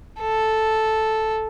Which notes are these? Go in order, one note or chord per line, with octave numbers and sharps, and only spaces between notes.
A4